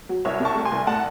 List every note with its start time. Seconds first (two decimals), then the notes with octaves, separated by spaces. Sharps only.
0.09 F#3
0.25 C2 C#5 E5
0.40 C3
0.45 A5 C#6
0.56 A3
0.65 G#5 C6
0.72 C2
0.87 A2 F#5 A5